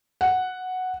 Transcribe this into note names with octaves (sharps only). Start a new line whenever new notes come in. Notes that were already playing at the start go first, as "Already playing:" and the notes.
F#5